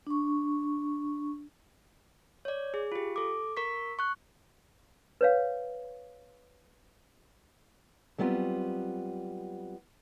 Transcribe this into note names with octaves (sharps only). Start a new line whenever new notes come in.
D4 C#6
C#5 D5
G#4
F4 G4
A4 D6
A#4 C#6 B6
C#6 F#6
B4 C#5 F5
F#3 G3 B3 C4 F4